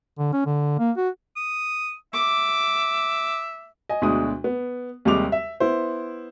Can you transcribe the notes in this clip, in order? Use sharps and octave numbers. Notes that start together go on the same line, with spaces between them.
D3
C#4
D3
A#3
F#4
D#6
E5 D6
D#5 G#5
D2 B2 G#3 D4 D#6
B3
D#2 C3 G3 G#3 D6 F7
E5
B3 E4 C5